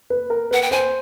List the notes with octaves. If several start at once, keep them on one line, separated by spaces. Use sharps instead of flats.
B4
A#4
B4 F#5
G5
C5 G#5